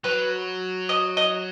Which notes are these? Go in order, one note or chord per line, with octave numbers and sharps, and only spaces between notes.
F#3 B4
D#5
D#5